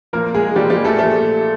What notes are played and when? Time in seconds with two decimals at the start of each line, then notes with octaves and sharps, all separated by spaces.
0.13 A#2 F3 A#3 A#4
0.35 G#3 G#4
0.56 A#2 F3 G3 G4
0.70 G3 G4
0.85 A3 A4
0.99 A#2 F3 A3 A4